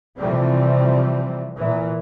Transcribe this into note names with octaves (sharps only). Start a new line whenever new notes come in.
C3 E3 F3 G3 A3 C4
A#2 E3